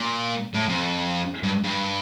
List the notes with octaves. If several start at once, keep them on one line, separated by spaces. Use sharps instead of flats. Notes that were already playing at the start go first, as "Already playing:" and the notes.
Already playing: A#2
A2
F2
G2
G2